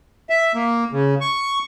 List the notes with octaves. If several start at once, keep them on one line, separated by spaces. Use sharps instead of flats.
E5
A#3
C#3
C#6